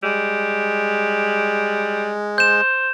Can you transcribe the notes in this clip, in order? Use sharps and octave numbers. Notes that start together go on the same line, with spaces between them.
G3 G#3
C5 G6 E7